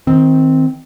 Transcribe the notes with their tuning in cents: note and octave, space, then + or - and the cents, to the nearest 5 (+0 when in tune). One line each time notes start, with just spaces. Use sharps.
D#3 +25 C4 +0